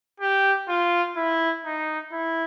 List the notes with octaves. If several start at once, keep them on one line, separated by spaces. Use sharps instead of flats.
G4
F4
E4
D#4
E4